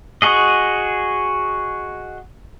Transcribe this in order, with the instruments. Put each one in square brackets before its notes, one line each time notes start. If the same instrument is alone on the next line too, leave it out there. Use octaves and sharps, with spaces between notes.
[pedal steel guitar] F#4 G#4 D#5